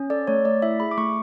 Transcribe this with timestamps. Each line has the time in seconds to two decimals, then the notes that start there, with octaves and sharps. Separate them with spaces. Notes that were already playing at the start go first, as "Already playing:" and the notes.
Already playing: C#4
0.10 A4 D5
0.28 A3 C#5
0.45 A3 D5
0.62 E4 E5
0.80 G#4 B5
0.91 D6
0.97 A3 C#6